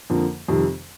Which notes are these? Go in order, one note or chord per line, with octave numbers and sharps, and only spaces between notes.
F2 D3 F3 A#3
F2 C3 D#3 G3